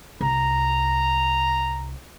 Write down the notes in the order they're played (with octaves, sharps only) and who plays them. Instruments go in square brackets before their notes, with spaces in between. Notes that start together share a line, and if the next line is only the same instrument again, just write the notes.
[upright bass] C2 [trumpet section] A#5